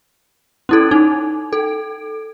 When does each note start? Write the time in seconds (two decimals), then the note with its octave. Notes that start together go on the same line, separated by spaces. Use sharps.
0.69 C#4 E4 A4
0.91 D#4
1.53 A4